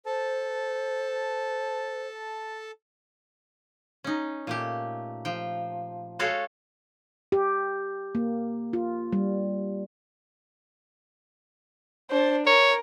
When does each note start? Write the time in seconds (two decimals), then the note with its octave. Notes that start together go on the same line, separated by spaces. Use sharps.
0.06 A4 C5 A5
4.04 C#4 D#4
4.47 A#2 A3 G4
5.25 F3 G5
6.19 G#3 F#4 A4 C#5 F5 G5
7.32 G4
8.15 A#3
8.73 F4
9.12 G3
12.10 D4 C5
12.46 A#4 C#5